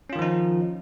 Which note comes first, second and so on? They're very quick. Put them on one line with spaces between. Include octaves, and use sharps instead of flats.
C#4 F4 D#3 F3 D#4